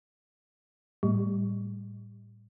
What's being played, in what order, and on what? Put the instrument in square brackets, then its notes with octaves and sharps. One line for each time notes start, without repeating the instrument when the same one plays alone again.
[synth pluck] A2 G3